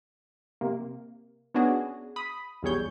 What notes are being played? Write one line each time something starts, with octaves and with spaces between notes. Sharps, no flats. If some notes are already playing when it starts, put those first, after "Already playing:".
C3 A#3
B3 C#4 D4 F#4 G#4
B5 D#6
B1 E2 G3 G#4 C#5 G6